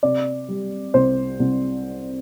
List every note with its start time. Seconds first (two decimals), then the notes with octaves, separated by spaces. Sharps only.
0.03 C3 D5
0.48 G3
0.94 C2 C5
1.40 C2